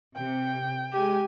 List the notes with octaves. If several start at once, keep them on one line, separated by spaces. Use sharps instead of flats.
C3 G5
G#3 G4 G#5